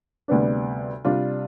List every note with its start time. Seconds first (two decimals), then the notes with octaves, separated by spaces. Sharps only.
0.28 D2 C3 G3 B3 D4
1.05 C3 G3 D4 F4